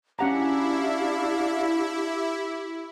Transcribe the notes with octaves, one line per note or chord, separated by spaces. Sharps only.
C#4 D4 E4 F#4 G4 F5 F#5 A#5